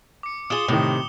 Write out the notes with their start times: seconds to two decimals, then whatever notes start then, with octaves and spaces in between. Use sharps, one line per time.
0.23 D6 C#7
0.50 F4 G#4 D#6 E7 G7
0.68 A2 C3 D#3